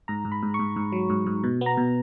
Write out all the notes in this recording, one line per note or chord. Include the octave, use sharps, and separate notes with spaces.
G#2 A#5
G#2
B5
G#2
C#6
G#2
G#2
F#3
G#2
G#2
B2
B3
A#5
B2